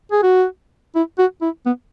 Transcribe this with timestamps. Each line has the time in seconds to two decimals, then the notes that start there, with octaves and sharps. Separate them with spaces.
0.12 G#4
0.23 F#4
0.95 E4
1.18 F#4
1.42 E4
1.66 B3